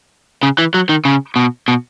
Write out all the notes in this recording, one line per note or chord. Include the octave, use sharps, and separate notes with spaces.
C#3
E3
F#3
D#3
C#3
B2
B2